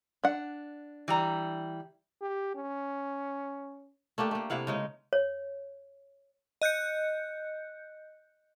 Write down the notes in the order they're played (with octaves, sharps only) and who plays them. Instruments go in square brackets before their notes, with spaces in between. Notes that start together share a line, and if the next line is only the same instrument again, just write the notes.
[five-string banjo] D4 F#5
[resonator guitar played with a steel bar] E3 G3 A#5
[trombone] G4
C#4
[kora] A3 A#3 D4 G4
A3 A#3
C3 E4 F5 F#5
C#3 G#3 D#4
[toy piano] C#5
[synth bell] D#5 F#6 G6 C#7